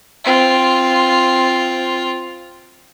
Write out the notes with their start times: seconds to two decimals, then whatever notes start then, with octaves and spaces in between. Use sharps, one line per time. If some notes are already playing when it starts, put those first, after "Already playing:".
0.24 C4 F4